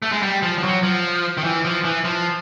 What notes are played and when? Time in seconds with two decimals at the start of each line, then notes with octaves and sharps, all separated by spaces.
0.02 A3
0.12 G#3
0.23 G3
0.43 F3
0.58 F3
0.63 F#3
0.83 F3
1.37 D#3
1.44 E3
1.65 F3
1.84 E3
2.05 F3